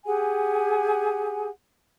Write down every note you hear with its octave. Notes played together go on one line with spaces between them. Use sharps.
G4 G#4 F#5 G#5